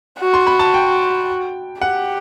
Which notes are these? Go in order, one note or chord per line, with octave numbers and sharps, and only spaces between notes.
F#4
C6
B5
A5
G5
G4 F#5